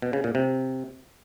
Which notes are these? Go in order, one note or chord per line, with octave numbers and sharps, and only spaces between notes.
B2
C#3
A#2
C3